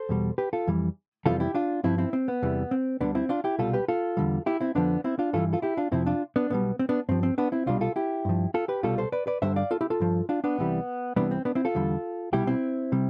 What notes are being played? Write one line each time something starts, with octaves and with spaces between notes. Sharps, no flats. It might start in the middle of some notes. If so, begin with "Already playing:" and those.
Already playing: A4 C5
E2 B2 G3
G4 B4
F4 A4
F2 E3 G3
F2 C3 E3 G3 F4 A4
E4 G4
D4 F4
G2 F3 C4 E4
C4 E4
C4
B3
E2 C3 E3 G3
C4
D2 D3 G3 B3 D4
C4 E4
D4 F4
E4 G4
C2 B2 G3 F4 A4
G4 B4
F4 A4
E2 D3 G3
E4 G4
C4 E4
F2 D3 F3 B3 D4
C4 E4
D4 F4
G2 E3 G3 F4 A4
F4 A4
E4 G4
D4 F4
F2 C3 F3 C4 E4
D4 F4
B3 D4
B1 B2 G3 B3
C4
B3 D4
G2 F3 C4
C4
B3 D4
C4 E4
C2 B2 G3 D4 F4
F4 A4
E4 G4
G2 F3
F4 A4
G4 B4
C2 B2 G3 F4 A4
A4 C5
B4 D5
B4 D5
G2 D3 G3 C5 E5
D5 F5
F4 A4
E4 G4
F4 A4
G2 F3
D4 F4
B3 D4
C2 C3 E3 G3
C2 C3 E3 G3 B3 D4
C4
B3 D4
C4 E4
F4 A4
E2 D3 G3
C2 B2 G3 E4 G4
C4 E4
C3 G3